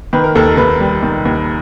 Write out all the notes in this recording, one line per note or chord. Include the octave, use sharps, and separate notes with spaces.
D#3 B4
A#4
D#2 A4
A#4
D#2 B4
G3
D#3
D#2